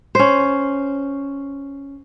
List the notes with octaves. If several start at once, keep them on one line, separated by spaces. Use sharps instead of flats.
C#4 C5